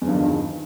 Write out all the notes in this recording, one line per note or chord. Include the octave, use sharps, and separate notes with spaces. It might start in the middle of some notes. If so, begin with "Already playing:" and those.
E2 G2 D3 D#3 F3